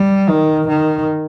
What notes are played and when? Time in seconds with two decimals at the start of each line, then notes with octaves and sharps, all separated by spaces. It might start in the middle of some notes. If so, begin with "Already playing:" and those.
Already playing: G3
0.29 D#3
0.68 D#3